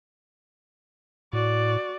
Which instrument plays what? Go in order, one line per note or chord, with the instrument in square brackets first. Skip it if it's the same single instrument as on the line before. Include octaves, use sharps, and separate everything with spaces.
[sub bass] A2 [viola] F#4 D5